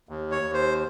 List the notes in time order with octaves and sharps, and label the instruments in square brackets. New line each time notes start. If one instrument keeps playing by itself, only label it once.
[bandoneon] D#2
C#5
D#2
C5